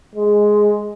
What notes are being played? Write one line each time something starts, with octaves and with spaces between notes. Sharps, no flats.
G#3